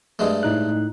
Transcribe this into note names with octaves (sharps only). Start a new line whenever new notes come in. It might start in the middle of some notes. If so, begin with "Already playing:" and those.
G2 G#3 A3
A2 D#4 F#6